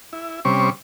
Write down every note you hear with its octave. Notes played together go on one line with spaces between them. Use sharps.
E4
C3 G3 C#4 C5 C#6 D6